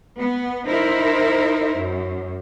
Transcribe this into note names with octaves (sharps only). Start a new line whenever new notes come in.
B3
D#4 E4 A#4 C5
F#2